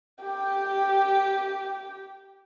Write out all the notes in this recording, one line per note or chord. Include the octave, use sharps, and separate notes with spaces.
G4 G5